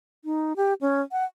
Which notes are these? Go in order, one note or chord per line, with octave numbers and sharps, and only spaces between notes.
D#4
G4
C#4
F#5